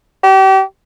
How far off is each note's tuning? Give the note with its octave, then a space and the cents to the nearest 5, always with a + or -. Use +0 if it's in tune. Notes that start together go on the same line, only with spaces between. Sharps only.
G4 -35